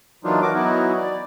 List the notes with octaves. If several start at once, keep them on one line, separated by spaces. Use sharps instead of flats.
E3 F#3 A#3 D4 D#4 F4
F#4 A#4 D6
E3 F#3 B3 D#4 E4 F#4
D5